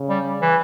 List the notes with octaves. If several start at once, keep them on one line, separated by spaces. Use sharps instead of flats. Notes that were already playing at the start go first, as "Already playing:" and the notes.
Already playing: C#3
G3
E3